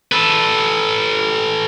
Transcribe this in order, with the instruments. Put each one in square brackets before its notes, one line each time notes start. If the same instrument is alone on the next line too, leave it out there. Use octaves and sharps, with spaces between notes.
[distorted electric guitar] A4 B4